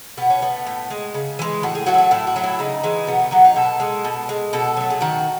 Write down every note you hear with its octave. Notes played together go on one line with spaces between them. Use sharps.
B2 B3
C#4
A3 B3
A2
G#3
C#3
E3 G#3
A2 F#4
G#4
F#3 A3 F#4
E4
F#4
A2 E4
F#4
F#3 A3
E4
C#3 D#4
E3 G#3
B2 B3
A3
F#3 A3 B3
D#4
B2 A4
G#3
B2
G#3
B2 A4
F#3 A3
G#4
D#3 F#4